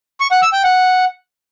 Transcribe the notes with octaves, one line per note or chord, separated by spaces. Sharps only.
C#6
F#5
E6
G5
F#5